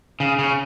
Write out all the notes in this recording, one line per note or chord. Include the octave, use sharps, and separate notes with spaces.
C#3
C#3